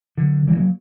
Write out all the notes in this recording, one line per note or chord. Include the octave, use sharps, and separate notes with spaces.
D3 F#3
E3 G3
F#3 A#3